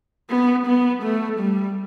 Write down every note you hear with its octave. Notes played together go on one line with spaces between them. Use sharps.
B3
B3
A3
G3